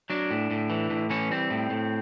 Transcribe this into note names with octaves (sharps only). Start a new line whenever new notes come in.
F#3 D4
A2
A2
E3
A2
E3 C#4
G3 C4
A2
A2